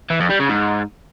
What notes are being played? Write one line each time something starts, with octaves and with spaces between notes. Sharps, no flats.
E3
F2
G3
C#3
G#2